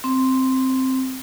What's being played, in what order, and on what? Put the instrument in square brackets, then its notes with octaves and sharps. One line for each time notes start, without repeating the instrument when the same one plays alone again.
[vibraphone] C4